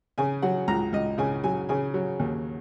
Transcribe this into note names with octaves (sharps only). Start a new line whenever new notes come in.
C#3 G#5
F#3 F#5
C#2 A#5
C#2 D#5
C#3 G#5
F#3 G#5
C#3 G#5
F#3
D#2